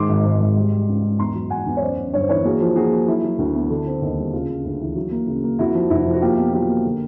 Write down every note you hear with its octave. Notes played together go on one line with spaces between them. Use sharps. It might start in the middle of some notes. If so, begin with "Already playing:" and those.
Already playing: G#2 D#3 C6 D6
G#1
G#2
G#2
G3
G3
C#2
C#2
E2 A#5 C6
F#3
E2 F#5 G#5
E2
C#5
F#2 C5 D5
F#2
G1 C#5
C5
E3 B4 C#5
A#3 F#4 G#4
F3
A#3 F#4 G#4
A#3
F#3 E4
F#3
D2
B3
D3
C4
D#2
G3
C#3 F4
C#3
D2
E3
F#3
A#3
C#3
A#3
F2 E4 F#4
F3
F1 E4 F#4
F3
F#4
A#3 F4 G4
B2
F#3 F4 G4
A#3
D3